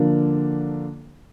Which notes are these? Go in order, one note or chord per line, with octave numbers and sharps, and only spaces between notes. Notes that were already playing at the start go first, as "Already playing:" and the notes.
Already playing: D3 F3 A#3 D4